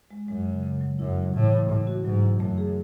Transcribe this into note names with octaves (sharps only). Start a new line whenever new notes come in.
G#3
F#2 G#3
C#3
C#3
F#3
F#2 E4
C#3
A2 E3
A3
A2 A3
F#4
G#2 F#3
E4
F#2 A3
G#4